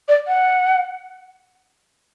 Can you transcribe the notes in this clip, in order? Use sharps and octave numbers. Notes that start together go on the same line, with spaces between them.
D5
F#5